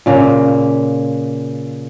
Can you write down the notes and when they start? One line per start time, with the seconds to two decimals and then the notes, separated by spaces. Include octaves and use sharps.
0.06 A#2 C#3 A#3